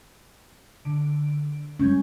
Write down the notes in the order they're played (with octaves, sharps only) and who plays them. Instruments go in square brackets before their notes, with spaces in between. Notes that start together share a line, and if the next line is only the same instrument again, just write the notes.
[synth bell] D3 D7
[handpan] G3 G#3 C#4 [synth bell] C#6 G6 G#6